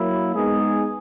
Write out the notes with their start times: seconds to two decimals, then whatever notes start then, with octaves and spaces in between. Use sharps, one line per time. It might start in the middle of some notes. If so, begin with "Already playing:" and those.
Already playing: F#3 A#3 E4
0.33 G#3 B3 D#4 G#4